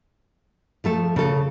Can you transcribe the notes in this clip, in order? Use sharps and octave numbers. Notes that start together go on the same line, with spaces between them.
F3 A3 A4
C#3 A4